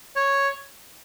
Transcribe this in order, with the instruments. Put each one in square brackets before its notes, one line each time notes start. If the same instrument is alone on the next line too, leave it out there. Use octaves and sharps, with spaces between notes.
[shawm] C#5